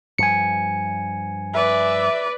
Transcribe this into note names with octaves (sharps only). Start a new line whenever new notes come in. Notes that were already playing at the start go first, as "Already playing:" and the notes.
G2 F3 G#5 C#7
B4 D5 E5